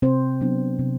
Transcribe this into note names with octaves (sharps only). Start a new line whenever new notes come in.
C3 C4 C5
F#3 B3 D4
C3